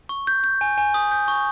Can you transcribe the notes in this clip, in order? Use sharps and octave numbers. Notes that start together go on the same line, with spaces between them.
C#6
G6
G6
G#5
G#5
D#6
G6
C#6